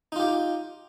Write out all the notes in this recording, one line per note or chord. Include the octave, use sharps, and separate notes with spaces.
D#4 F4 G4